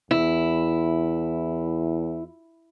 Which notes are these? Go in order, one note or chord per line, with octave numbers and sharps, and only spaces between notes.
E2 E4